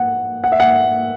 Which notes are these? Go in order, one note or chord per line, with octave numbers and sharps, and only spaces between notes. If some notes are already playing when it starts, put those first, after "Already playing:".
Already playing: F#5
F#5
E5
F#5